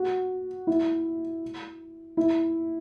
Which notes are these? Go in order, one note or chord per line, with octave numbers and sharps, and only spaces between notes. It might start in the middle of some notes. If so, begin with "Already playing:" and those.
Already playing: F#4
E4
E4